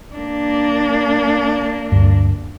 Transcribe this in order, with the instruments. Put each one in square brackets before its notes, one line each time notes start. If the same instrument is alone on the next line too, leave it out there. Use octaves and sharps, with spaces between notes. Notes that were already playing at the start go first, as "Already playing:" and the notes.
[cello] A#3 D4
[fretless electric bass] D2 G2